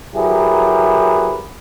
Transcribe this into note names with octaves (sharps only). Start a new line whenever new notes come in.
F#3 E4 G4 G#4 A#4 B4